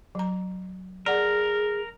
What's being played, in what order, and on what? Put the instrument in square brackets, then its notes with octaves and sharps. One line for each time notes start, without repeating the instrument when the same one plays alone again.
[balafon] F#3 A#5
[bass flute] G#4 [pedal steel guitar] A#4 [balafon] D5 F#5